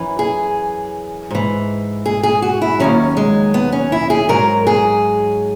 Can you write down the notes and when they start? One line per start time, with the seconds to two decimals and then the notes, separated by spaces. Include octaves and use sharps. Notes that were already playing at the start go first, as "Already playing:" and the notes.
Already playing: F#2 E3
0.19 G#4
1.31 G#2 E3
2.06 G#4
2.23 G#4
2.42 F#4
2.62 E4
2.80 D#2 D#3 F#3 C#4
3.17 G#3
3.54 B3
3.72 C#4
3.92 E4
4.10 G#4
4.29 G#2 F#3 A#4
4.67 G#4